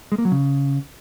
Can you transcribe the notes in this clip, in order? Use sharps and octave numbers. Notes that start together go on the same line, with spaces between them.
G#3
A#3
F#3
C#3